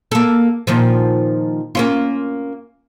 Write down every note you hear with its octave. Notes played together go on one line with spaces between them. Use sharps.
A#3 A4
A#2 D#3 F3
A#3 C#4 F4